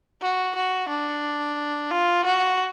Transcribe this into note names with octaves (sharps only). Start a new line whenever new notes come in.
F#4
F#4
D4
F4
F#4